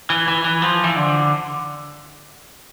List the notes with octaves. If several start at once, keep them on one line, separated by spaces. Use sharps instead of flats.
E3
E3
E3
F3
E3
D3